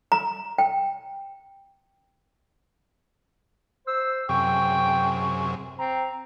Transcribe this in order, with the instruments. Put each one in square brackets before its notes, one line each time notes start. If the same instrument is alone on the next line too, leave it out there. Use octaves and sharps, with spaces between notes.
[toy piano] A#5
G5
[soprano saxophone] C5 [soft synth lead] E6
[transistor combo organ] F#2 C3 G#4 [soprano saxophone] G5 [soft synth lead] C#6
[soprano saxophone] C4 [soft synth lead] A#5